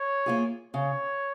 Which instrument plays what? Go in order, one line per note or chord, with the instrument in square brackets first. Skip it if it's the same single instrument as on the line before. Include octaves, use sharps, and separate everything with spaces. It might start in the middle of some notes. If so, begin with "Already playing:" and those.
Already playing: [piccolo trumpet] C#5
[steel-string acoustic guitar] A#3 F4 G#4
[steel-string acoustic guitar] C#3 [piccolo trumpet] C#5